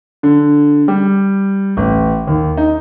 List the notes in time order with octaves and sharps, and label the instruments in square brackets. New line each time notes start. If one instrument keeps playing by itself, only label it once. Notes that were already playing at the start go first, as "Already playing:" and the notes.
[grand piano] D3
G3
A1
D#2
D#4